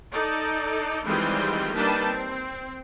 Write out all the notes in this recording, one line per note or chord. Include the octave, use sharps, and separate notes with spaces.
D#4 A4 D5
D#3 E3 G3 G#3 C4 F4
G3 A#3 D4 D#4 B4 A5
C4